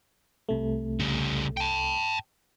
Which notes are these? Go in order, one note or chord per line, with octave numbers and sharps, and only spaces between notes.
C2 C3 A3
C#3 G3
G5 A5